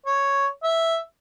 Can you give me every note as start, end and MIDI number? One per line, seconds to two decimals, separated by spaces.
0.06 0.47 73
0.64 0.97 76